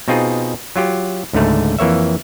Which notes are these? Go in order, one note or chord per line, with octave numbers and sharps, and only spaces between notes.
B2 C4 D#4 F4 G#4
F#3 F4 G4
C#2 G#2 D3 A3
F2 E3 A#3 C#5 E5